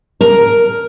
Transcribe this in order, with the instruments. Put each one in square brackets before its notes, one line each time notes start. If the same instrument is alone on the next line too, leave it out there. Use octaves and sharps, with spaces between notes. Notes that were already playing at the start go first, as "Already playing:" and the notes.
[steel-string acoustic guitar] A#4